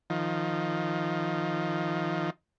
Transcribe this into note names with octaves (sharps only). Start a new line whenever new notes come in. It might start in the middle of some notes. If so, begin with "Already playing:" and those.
D#3 F3